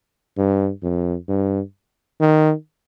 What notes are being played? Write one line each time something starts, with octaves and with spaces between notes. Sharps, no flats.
G2
F2
G2
D#3